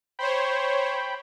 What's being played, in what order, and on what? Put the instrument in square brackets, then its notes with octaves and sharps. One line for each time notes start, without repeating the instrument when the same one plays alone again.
[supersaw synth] C5 C#5 [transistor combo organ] G5 B5